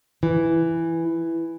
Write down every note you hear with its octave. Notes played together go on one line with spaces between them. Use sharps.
E3